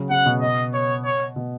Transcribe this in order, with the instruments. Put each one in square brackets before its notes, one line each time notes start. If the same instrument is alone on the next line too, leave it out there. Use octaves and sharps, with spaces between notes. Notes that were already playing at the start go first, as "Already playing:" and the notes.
Already playing: [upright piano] C#3 F#3
[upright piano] C#3 [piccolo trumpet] F#5
[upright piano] B2
[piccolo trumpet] D#5
C#5
C#5
[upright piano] B2